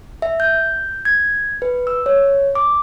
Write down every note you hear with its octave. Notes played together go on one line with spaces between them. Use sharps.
E5
G6
G#6
B4
E6
C#5
D6